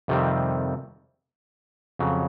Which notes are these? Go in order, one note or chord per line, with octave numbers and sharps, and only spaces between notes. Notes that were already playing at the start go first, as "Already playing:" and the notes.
F2 C3 D#3 G3 C4
F2 C#3 F#3